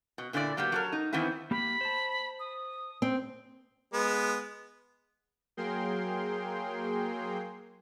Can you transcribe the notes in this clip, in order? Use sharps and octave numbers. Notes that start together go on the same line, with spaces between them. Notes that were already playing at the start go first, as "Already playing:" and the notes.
B2
A#2 D3 E4 F4 D5
F#3 A#3 B3 G4
F#3 A4 A#4
D#4
D#3 E3 B3 C4 E4
A#3 G4 B5
C5 A5
D#6
C4
G#3 B3
F#3 A#3 G#4 A#4 G5 C6